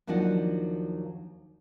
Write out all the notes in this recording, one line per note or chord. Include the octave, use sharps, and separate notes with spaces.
D#2 F3 F#3 D4 D#4 F#5